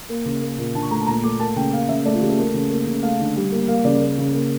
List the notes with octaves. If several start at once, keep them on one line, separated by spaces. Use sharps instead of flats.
A#3
C#3
A#3
A#2
D3 A5
C#6
A3 A#5
A5
A#2 A#5
A3 D6
A#3 A5
C#3 G5
A#3 F5
C#3 E5
A3 D5
F4
C#3 G4
A4
A3 A#4
C#3
A#3
C#3
A3 F5
D3
G3
A#3
A#3 F5
C#3 D5
A#3
C#3
A#3